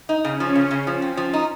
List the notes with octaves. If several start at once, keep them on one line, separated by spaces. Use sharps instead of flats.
D#4
C#3 C#4
F3
C#3
C#3
F3
C4
F3
D#4